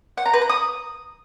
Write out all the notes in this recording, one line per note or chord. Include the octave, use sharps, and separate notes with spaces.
F#5
A#5
B4
A#5
D#6